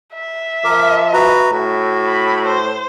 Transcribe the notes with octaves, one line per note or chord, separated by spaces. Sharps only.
E5
F3 A#4 D6
F#4 B4 A#5
A2 F#4
B5
C5